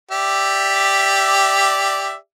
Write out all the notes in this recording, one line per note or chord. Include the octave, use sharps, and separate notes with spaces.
G4 D5 E5